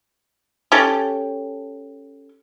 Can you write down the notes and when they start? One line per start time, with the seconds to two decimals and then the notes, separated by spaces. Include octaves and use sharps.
0.72 C#4 G4 A4